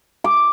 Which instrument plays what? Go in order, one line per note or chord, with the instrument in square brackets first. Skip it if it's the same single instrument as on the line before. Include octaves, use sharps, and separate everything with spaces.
[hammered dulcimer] D6